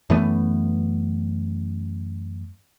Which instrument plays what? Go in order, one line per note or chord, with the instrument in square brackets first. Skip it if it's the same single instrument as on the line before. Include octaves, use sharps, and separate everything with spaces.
[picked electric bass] F#2 E3 A3 B3